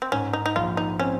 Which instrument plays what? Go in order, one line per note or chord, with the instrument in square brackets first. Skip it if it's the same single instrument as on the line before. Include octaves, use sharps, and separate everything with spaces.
[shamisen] C4
[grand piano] G#2 [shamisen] C#4
[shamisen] D#4
D#4
[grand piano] A#1 [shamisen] F4
[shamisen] D#4
[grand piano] C4 [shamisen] C#4